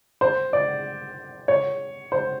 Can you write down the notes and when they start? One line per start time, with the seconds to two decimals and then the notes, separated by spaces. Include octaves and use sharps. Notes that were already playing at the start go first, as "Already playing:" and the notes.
0.21 C5
0.53 D5
1.48 C#5
2.12 C5